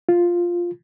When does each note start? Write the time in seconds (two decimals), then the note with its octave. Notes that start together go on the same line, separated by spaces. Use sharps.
0.09 F4